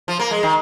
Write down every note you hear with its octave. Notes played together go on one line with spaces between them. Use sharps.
F3
A#3
G#3
D#3